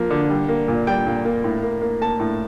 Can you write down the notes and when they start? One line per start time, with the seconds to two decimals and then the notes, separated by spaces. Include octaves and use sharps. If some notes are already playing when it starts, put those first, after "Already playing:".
Already playing: F3 A#3
0.10 D3
0.30 G3
0.48 A#3
0.68 A#2
0.87 G3 G5
1.07 A#2
1.25 A#3
1.44 A2
1.63 A#3
1.82 A#3
2.01 A#3 A5
2.20 A2